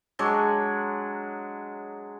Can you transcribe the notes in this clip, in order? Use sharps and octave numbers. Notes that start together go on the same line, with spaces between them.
F#3 G#3 D4 C#5